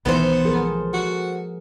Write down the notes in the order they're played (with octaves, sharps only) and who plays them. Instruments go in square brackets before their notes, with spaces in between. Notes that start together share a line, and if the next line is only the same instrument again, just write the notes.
[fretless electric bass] B1 D#3 E3 [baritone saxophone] B3 [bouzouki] A4 C5
[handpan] F3 G#4 A#4
[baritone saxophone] F#4